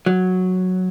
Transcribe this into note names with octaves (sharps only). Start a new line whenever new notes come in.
F#3